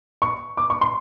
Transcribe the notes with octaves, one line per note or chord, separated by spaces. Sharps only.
C#6
D6
C#6
C6